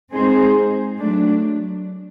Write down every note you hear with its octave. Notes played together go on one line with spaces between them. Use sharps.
G#3 C4 D#4 G#4 C5
F#3 A3 D4